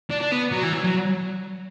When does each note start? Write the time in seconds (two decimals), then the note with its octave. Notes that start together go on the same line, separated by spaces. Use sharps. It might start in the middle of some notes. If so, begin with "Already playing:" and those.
0.11 D4
0.22 D4
0.32 B3
0.52 F#3
0.64 E3
0.73 F#3
0.84 F#3